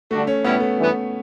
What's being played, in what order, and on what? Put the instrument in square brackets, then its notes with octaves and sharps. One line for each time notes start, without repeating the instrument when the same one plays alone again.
[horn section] D3 G3 D4 F#4 [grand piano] A3
[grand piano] C#4
[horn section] A2 G3 C#4 E4 [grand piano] B3
[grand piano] A3
[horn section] G2 E3 B3